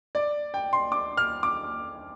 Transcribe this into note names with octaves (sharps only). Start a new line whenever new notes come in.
D5
G5
C6
D6
F6
D6